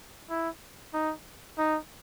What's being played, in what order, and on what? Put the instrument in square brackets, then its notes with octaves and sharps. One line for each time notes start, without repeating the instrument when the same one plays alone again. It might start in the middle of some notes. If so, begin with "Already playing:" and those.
[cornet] E4
D#4
D#4